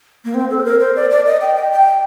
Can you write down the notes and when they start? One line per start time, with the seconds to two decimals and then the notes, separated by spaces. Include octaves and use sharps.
0.25 A#3
0.34 C4
0.51 A4
0.60 C5
0.65 A#4
0.80 C5
0.96 D5
1.10 D5
1.26 D#5
1.41 G5
1.56 G5
1.72 G5